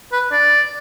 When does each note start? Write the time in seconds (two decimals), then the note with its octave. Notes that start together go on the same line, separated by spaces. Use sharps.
0.12 B4
0.32 D5